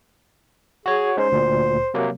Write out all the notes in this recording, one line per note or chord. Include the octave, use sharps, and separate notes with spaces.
F#4 G#4 C#5
G#3 C#4 D#4 C5
D2 A#2
C3 F#3 A#3